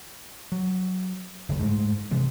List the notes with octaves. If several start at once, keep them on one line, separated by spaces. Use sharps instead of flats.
F#3
F#1 D2
G#2 G#3 A3
C3 E3 G#3